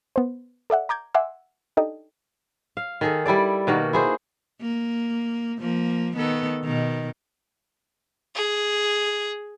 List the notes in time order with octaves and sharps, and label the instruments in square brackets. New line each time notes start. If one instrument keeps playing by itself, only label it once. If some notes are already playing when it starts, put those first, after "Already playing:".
[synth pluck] B3 C5
A4 D5 E5 F#5
A#5 D6 G6 G#6
E5 F#5 G#5 C6 D6 E6
D4 D#4 G4 A4 D#5
[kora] F5
D#3 G#4 A4
G3 E4 A4 D5
B2 D#3 A#3 F#4
E4 G#4 C5
[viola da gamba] A#3
F3 A#3
D#3 B3 A4
B2 D#3
[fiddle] G#4